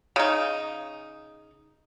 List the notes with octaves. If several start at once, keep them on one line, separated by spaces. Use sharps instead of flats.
C#3 D#4